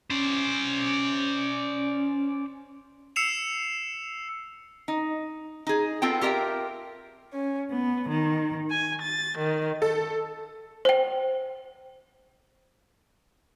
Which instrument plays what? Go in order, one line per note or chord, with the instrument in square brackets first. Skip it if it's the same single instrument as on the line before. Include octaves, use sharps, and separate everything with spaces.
[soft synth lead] C#4 [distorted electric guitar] C5 D5
[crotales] E6 C7 C#7 E7 F7
[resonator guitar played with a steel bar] D#4
D#4 G#4
B3 C4 F4 A4 G5
F4 G4 A#4 D#5 E5 G5
[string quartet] C#4
B3
D#3
G#5
A6
D#3
[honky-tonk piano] A4
[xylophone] C5 G5